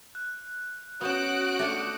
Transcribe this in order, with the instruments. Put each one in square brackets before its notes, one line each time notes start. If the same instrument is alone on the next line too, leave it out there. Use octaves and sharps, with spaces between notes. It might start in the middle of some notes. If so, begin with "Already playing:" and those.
[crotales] F#6
[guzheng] B3 C#4 [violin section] F#4 F#6 D7 [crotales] D#6 G6 E7
[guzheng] A3 D4 [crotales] D6 C#7